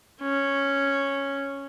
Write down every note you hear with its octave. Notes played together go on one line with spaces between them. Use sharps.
C#4